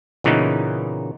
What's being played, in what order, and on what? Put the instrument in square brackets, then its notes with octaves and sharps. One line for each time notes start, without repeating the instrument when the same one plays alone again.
[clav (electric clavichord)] A#2 C#3 E3 B3 D#4